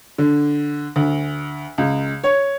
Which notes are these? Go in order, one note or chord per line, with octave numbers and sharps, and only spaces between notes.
D3
D2
C#2
C#5